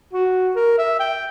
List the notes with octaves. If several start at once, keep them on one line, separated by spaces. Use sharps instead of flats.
F#4
A#4
E5
G5